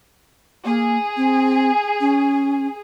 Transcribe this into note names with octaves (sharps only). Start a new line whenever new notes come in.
A#3 G#4
C4
C#4